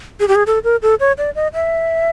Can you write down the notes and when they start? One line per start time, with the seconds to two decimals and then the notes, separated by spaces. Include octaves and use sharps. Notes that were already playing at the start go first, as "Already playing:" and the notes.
0.20 G#4
0.28 G4
0.35 G#4
0.47 A4
0.64 A#4
0.82 A4
1.00 C#5
1.18 D5
1.35 D#5
1.54 E5